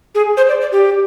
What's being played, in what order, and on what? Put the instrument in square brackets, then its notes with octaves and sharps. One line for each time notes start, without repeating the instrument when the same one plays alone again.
[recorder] G#4
C5
D5
D5
G4